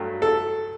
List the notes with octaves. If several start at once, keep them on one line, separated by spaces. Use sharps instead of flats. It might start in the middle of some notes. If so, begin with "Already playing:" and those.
Already playing: G2 F#3 A3
A4